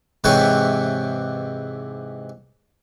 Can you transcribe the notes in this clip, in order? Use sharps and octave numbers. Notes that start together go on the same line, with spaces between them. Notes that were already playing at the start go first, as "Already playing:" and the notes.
G#2 C3 E3 B4 C#5 G5